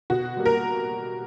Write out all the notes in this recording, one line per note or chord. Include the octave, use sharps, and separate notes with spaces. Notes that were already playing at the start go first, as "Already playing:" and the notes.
B2 F#4
G3 A#3
A#4